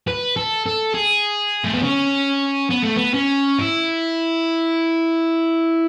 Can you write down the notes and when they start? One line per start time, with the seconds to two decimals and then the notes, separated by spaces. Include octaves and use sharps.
0.07 B4
0.37 A4
0.66 A4
0.95 G#4
1.64 A3
1.73 B3
1.82 C#4
2.70 B3
2.83 A3
2.97 B3
3.14 C#4
3.58 E4